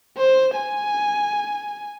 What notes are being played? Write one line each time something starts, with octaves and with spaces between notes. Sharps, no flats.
C5
G#5